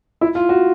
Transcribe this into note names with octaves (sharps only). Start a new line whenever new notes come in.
E4
F4
F#4